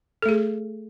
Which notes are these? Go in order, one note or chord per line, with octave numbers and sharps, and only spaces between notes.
A3 G#4 A4